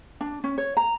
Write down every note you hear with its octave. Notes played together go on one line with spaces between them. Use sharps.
D4
C#4
C#5
A#5